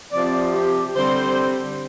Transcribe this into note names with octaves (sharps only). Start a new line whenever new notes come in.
C3 F3 C4 D5
G4
D3 G3 C4 C5